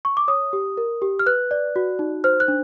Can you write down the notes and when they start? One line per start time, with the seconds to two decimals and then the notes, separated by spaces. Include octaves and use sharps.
0.05 C#6
0.17 D6
0.28 C#5 D#6
0.53 G4
0.77 A#4
1.02 G4
1.19 F6
1.26 B4 F#6
1.51 D5
1.76 F#4
1.99 D#4
2.24 C5 F6
2.40 F#6
2.48 D4